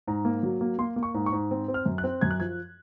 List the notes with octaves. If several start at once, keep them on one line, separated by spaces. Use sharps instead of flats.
G#2 A#5
A#3
F#3
A#3
A#3 C6
A#3
C#6
G#2
C#6
G#2
C4
C4
F6
F#2
F#6
C4
F#2 G#6
F#6
F3 G#6